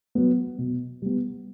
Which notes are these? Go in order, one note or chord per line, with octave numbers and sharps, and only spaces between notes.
F#3 B3
B2
G3 B3